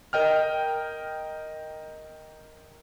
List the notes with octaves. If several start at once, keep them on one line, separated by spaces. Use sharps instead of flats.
A#4 D#5 G5 F6